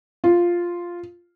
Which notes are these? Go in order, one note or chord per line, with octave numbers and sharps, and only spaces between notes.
F4